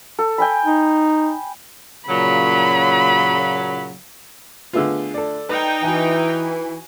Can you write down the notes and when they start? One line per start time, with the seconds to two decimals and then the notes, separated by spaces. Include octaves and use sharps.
0.19 A4
0.38 G5 G#5 B5
0.65 D#4
2.08 A#2 C#3 F#3 B5
4.73 D3 A3 B3 F4 G#4 E6
5.14 A4 D5
5.49 D#4 B4 G5
5.83 E3 F#4 G#5